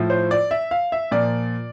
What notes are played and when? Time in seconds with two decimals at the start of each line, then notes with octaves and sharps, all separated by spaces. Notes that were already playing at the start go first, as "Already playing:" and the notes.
Already playing: A2 F3
0.10 C5
0.31 D5
0.51 E5
0.71 F5
0.92 E5
1.11 A#2 F3 D5